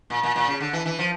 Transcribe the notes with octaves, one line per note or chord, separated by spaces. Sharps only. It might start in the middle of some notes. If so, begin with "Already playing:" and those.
A#2
A#2
A#2
C#3
D3
E3
E3
F3